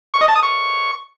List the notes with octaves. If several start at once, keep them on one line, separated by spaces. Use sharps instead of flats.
C#6
D#5
A5
D#6
C#6